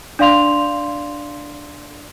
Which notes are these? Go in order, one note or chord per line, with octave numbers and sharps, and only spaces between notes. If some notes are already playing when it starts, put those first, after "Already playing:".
D4 D5 F5 C6 F7